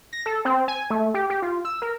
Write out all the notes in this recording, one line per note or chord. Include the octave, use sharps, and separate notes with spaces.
A#6
A4
C4
G#5
A3
G4
G4
F4
E6
A#4